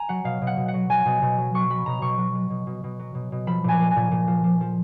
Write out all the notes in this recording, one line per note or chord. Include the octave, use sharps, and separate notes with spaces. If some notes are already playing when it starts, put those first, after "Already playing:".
Already playing: G#5 A#5
F#3 F#5
B2 F5
B2
F#5
B2
F#5
F#3
F#3 G#5
B2
B2
F#3
F#3 C#6
F#3 B5
B2 A#5
B2 C#6
F#3
F#3
B2
B2
B2
F#3
B2
B2
F3 B5
A#2 G#5
F3
G#5
A#2
A#2
F3
F3
F3